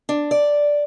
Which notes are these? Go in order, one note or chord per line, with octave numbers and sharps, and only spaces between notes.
D4
D5